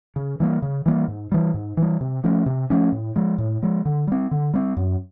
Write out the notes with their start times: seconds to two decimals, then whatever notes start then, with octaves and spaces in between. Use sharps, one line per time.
0.16 C#3
0.40 E3 G3 A#3
0.62 C#3
0.86 E3 G3 A#3
1.08 G#2
1.32 E3 G3
1.54 G#2
1.77 E3
1.82 G3
2.01 C3
2.24 F3 A3 C#4
2.46 C3
2.70 F3 A3 C#4
2.92 A2
3.16 F3 G#3
3.38 A2
3.62 F3 G#3
3.85 D3
4.07 G3 C4
4.31 D3
4.54 G3 C4
4.77 F#2